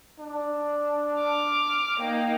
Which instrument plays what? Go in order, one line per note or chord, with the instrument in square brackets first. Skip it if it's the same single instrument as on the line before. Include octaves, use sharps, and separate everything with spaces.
[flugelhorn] D4
[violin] D6 F6
[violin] A#3 D#4 [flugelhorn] G5